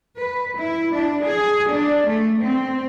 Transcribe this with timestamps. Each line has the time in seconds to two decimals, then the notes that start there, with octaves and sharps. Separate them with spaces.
0.17 B4
0.57 E4
0.93 D4
1.24 G#4
1.70 D4
2.06 A3
2.40 C4